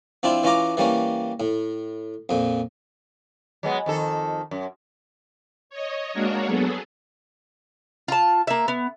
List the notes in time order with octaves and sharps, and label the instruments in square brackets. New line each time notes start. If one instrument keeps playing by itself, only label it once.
[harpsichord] F3 C4 D4 E4 F4
E3 C#4 F4 A#5 D6
E3 G3 A#3 C#4
A2
F2 A#2
[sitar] F#3 G#3 B3
F2 D#3 A4
F#2
[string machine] C#5 D#5
G#3 A#3 D4 F#4 A#4 C#5
F#3 B3 G#4 A4
[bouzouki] F4 A5
A#3 E5
B3